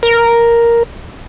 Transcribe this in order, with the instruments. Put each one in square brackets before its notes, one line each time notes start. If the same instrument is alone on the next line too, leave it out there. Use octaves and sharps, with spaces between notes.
[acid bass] A#4